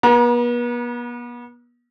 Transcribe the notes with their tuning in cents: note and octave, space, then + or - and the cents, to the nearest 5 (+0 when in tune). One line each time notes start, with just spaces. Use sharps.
B3 -40 A#5 +40